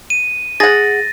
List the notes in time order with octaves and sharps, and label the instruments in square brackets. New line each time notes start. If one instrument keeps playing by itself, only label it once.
[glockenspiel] D#7
[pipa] G#4 F#5 [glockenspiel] A6 A#6